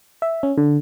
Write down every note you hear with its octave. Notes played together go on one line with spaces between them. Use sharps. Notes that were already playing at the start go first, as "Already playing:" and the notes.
E5
C#4
D3